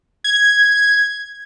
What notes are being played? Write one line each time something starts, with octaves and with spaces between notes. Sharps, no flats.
G#6